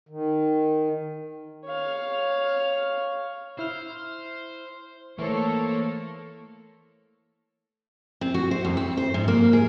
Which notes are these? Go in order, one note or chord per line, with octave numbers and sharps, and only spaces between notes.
D#3
C#5 F5
E4 C5 F6
E3 A3 A#3 A4 C5 C#5
C4
F#4
C5
F2
C4
C5
G#2
A#3
G#4